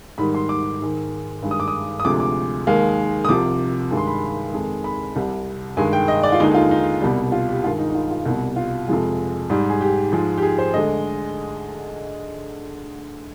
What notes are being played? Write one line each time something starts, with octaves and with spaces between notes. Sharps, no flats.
G#2 D#3 G3 B5
C6
D6
G#2 D#3 G#3
G2 D#3 G#3
D#6
D6
D#6
D#6
D2 C3 F3 G#3 D6
D6
D#2 D#3 G#3 F5
D#6
C2 C3 F3 D6
G2 D#3 G#3
C6
B5
F2 D#3 G#3
B5
C2 C3 G3
G2 D#3 G#3 G#5
G5
D#5
D5
F4
D#2 D3 G#3 D#4
D#4
F4
D#4
C2 B2 G3
F4
G4
G2 D#3 G#3 F4
D#4
D#4
F4
F4
C2 B2 G3
F4
F2 C3 F3 G#3
G#2 G3
G#4
G4
G#2 F3 G#3
G4
G#4
C5
D2 D3 G#3 D#5